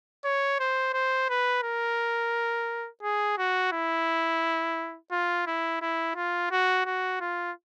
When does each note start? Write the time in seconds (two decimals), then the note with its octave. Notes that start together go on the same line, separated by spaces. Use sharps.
0.25 C#5
0.60 C5
0.94 C5
1.30 B4
1.64 A#4
3.03 G#4
3.38 F#4
3.73 E4
5.11 F4
5.47 E4
5.82 E4
6.16 F4
6.51 F#4
6.86 F#4
7.21 F4